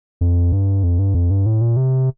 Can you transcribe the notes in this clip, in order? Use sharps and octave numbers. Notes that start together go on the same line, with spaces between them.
F2
G2
F2
G2
F2
G2
A2
A#2
C3